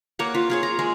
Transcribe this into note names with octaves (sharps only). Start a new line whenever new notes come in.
A#3 C#5 F#5
F4
F4 G#4 C#5
A#5
G#3